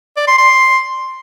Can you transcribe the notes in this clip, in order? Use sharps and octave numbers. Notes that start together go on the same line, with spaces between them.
D5
C6
C6